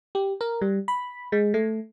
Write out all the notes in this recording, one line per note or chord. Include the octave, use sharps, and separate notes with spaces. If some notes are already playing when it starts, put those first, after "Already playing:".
G4
A#4
G3
B5
G#3
A3